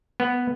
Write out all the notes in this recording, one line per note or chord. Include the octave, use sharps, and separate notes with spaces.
B3